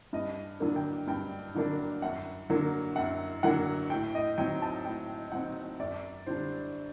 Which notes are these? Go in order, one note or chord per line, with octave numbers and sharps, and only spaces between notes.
G2 D#5
D3 F#3 A#3 D4
G5
G2 G5
D3 F#3 A#3 D4
F#2 F#5
D3 F#3 A#3
F#2 F#5
D3 F#3 A#3 F#5
A2 G5
D#5
F#3 C4 D#4 G5
A5
A2 G5
F#3 C4 D#4 F#5
F#2 D5
D3 G3 D4 C5